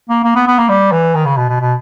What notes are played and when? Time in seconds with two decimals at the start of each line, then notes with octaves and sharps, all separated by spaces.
0.09 A#3
0.24 A#3
0.35 B3
0.47 B3
0.58 A#3
0.69 G3
0.92 E3
1.15 D#3
1.26 C#3
1.37 B2
1.49 B2
1.60 B2